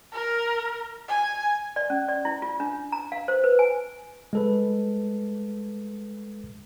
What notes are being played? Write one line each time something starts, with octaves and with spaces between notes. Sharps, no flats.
A#4
G#5
D5
C#4
D5
E4
F4
D4
A#5
F5
C5
B4
G#5
G#3 A4 B4